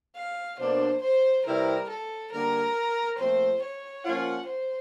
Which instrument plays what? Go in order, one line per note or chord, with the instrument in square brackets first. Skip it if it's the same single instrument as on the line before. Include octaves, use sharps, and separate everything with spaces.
[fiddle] F5
[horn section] B2 F#3 A#3 D4 [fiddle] C5
[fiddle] C5
[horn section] C3 E3 G3 C4 E4 [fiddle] A#4
[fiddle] A4
[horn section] D3 G3 A#3 [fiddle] A#4
[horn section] A#2 F3 A3 C4 [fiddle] C5
[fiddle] C#5
[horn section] F3 A#3 C#4 F4 [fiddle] F#5
[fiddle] C5